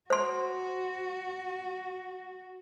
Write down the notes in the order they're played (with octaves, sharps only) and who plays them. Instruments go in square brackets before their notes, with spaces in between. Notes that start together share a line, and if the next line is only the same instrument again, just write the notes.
[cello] F#4 [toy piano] C5 C6